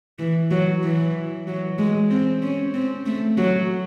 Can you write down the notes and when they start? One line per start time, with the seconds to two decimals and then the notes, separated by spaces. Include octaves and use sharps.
0.19 E3
0.51 F#3
0.83 E3
1.47 F#3
1.78 G#3
2.11 C4
2.42 C#4
2.74 C4
3.06 A3
3.37 F#3